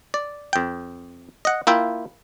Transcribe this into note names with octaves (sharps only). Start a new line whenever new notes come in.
D5
F2 G5
D#5 F#5
A#3 E4 F4 E5 G5